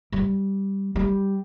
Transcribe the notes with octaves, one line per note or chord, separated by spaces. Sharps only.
G3
G3